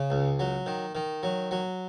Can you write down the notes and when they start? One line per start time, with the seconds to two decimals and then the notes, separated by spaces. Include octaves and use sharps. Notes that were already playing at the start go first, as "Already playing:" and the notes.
Already playing: C#3
0.10 C#2
0.39 F#3
0.66 D#3
0.95 D#3
1.23 F#3
1.51 F#3